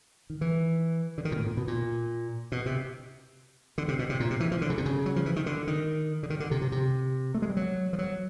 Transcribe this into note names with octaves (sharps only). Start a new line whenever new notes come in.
D#3
E3
D3
D#3
A#2
A2
A#2
B2
A#2
B2
C3
D3
C3
B2
C3
A#2
C3
E3
F3
D3
C#3
C3
C#3
F#3
F3
E3
D#3
D3
D#3
D3
D#3
D3
C3
C3
C3
A3
G#3
G3
F#3
F3
F#3